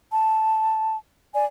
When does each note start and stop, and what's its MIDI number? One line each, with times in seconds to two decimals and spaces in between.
0.11 0.95 81
1.34 1.45 74
1.34 1.45 80